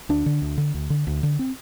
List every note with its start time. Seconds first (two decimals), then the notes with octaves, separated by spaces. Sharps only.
0.09 D2 D4
0.26 D3
0.42 D2
0.58 D3
0.74 D2
0.90 D3
1.07 D2
1.23 D3
1.39 C4